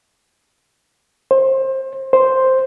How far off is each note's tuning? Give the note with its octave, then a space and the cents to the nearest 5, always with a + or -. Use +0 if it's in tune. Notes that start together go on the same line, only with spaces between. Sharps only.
C5 +25
C5 +0